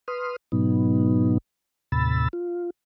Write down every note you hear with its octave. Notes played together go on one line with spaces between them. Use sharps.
B4 C6 D#6 F6
G#2 B2 F#3 B3 D#4
D#2 A2 C3 B5 E6 A6
F4